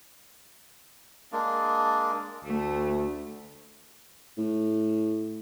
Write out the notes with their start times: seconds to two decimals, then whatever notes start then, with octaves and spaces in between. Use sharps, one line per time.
1.32 G#3 A#3 D4
2.45 D2 A3
4.38 A2